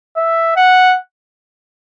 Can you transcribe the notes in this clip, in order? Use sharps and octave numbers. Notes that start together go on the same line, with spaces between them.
E5
F#5